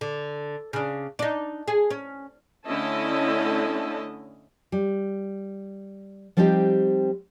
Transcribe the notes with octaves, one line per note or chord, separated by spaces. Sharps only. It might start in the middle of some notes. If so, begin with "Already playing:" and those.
D3
C#3 D4
D4 D#4
G#4
C#4
D3 A3 C#4 E4 D#5 A5
G3
F3 G3 C4 D#4 G4